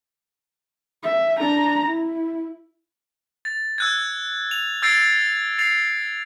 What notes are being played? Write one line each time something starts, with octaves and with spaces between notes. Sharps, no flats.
E5
D4 A#5
E4
A6
E6 F#6 G#6
F7
E6 G#6 A6 C7 D7
A6 C7 F7